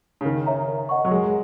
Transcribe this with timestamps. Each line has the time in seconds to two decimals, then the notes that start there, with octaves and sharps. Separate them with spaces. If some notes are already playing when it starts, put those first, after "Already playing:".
0.21 C#3
0.25 D#3 A#4
0.46 C#5 E5 A#5
0.68 A#4
0.89 D#5 F#5 C#6
1.05 F#3
1.11 G#3 G#4